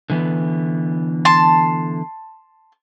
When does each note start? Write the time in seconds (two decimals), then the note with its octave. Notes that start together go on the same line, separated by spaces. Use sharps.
0.10 D3 E3 B3
1.25 A5 C6